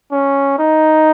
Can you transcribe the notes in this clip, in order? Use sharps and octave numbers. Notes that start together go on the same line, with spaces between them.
C#4
D#4